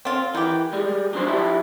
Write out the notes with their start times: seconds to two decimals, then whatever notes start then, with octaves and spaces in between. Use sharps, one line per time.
0.05 C4 F4
0.35 D#3 E3 G4
0.73 G3 G#3
1.13 F#3 D4 C5
1.27 F3 E4 G4